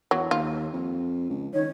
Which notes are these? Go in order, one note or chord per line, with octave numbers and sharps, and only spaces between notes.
E2 F#3
D#2 F4
F2
C#2
D#3 C#5